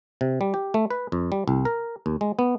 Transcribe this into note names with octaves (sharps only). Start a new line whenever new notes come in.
C3
G3
G4
A3
B4
F2
G3
C2
A#4
D#2
G#3
B3